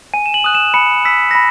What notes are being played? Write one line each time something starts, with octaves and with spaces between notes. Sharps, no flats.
G#5 D#7
E7
F#7
D#6 F#6
E7
B5 C#7
E6 B6
A#6
B5